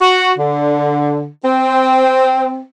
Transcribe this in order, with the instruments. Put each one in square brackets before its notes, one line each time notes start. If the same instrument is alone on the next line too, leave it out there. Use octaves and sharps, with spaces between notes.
[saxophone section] F#4
D3
C4